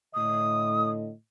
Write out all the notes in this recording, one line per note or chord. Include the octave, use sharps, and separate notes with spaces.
A2 D3 D#5 D#6